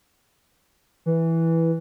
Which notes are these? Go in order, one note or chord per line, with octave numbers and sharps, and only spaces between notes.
E3